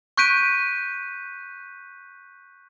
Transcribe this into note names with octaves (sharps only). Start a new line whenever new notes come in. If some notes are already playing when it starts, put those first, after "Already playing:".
C#6 F#6 G6 B6 D7 D#7